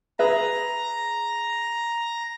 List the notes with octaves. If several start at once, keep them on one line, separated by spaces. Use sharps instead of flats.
G#4 B4 E5 A#5